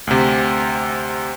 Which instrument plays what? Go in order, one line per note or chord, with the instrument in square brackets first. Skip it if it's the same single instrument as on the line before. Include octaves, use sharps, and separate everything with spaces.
[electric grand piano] D2 C3